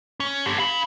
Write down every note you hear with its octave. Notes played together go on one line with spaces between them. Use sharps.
C#4
D3 G4
F5 B5